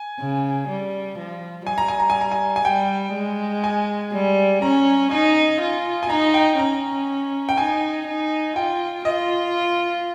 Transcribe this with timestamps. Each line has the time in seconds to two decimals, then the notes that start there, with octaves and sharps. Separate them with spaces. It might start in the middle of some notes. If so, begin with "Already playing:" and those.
Already playing: G#5
0.19 C#3
0.68 G3
1.18 F3
1.67 G3 G#5
1.78 A#5
1.88 G#5
2.00 A#5
2.10 G#5
2.21 A#5
2.32 G#5
2.56 G#5
2.65 G3 G5
3.14 G#3
3.64 G#5
4.12 G3
4.62 C#4 A#5
5.11 D#4 G#5
5.61 F4
6.03 G#5
6.10 D#4 A#5
6.34 G5
6.59 C#4 A#5
7.49 G5
7.58 D#4 G#5
8.06 D#4
8.56 F4 G5
9.05 F4 D#5